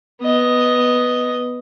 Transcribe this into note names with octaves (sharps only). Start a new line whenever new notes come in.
B3 D#5